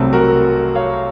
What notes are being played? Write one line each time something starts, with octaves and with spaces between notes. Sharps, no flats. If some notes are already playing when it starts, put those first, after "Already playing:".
Already playing: C2 C3 F#3 A3 C4
F#4 A#4
C#5 F5